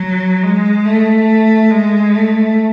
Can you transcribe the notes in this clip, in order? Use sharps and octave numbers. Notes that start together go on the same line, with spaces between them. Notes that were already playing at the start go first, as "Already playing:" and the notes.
Already playing: F#3
G#3
A3
G#3
A3